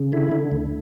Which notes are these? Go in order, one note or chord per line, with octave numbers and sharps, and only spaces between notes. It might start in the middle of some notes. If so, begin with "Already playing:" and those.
Already playing: C#3
D3 E4
D3
D2